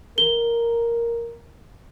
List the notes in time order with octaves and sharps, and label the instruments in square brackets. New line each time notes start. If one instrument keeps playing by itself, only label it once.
[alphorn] A#4 [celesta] G7